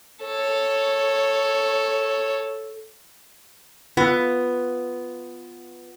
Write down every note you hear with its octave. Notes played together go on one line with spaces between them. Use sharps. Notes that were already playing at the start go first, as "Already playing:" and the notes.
A4 C#5
B3 F4